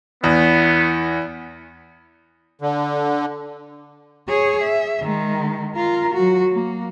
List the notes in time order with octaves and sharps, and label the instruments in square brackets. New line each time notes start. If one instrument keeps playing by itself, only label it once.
[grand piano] E2 [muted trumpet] B3
[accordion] D3
[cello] G#4 C#5
E5
D#3 G#3
F4 A#4
F#3 F#4
A#3